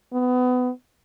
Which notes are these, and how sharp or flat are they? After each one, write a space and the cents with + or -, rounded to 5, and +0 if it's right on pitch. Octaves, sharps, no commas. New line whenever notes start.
B3 +25